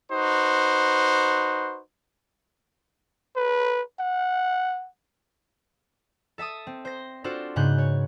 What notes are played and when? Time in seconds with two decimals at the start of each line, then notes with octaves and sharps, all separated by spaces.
0.12 D#4 F#4 B4 C5
3.36 B4
4.00 F#5
6.38 A4 E5 A5 D#6
6.67 C4
6.85 C5 A#6
7.24 D4 F4 F#4 A4 C5
7.56 G#2 C#3 B3 F#6 G6
7.78 C#5